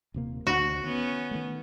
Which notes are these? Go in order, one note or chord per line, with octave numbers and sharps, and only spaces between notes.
D#1 C3 A#3
D2 F#4
D#3 B3 C#4
D#3 A3